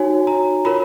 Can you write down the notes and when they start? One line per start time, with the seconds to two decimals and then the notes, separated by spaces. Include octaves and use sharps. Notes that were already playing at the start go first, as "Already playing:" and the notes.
Already playing: D#4 F#4 C#5 G#5
0.27 A#5
0.65 F4 A#4 C#5 B5